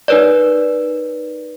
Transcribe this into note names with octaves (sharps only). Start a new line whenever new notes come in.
D#4 A#4 B4 C#5 D5